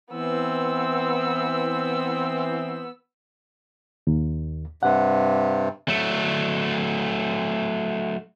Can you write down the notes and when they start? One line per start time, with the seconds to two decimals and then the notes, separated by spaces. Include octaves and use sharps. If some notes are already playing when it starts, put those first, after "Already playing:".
0.12 E3 B3 C4 E6
4.07 D#2
4.83 G2 C3 F#5
5.88 F#3 A3